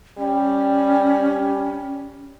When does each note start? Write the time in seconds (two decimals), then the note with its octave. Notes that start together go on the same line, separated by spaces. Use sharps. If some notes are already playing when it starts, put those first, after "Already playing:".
0.18 G3 C#4